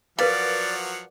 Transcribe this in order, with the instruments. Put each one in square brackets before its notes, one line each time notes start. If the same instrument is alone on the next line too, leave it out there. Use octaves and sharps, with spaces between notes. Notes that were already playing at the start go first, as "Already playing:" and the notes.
[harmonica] F3 F#3 F#5 [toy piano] A#4 B4 F5 [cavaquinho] D5